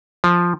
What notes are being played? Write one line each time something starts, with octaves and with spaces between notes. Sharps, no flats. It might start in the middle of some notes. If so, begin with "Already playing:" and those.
F3